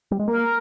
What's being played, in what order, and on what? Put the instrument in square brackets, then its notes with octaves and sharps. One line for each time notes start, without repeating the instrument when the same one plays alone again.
[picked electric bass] G3
G#3
[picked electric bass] A#3 [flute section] A#4